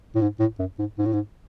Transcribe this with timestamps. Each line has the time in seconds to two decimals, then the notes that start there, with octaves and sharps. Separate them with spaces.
0.15 A2
0.21 G#2
0.39 A2
0.59 F#2
0.79 G#2
0.98 G#2
1.06 A2
1.13 G#2